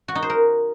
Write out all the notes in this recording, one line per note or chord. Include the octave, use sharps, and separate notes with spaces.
F#4
D#4
C5
A#4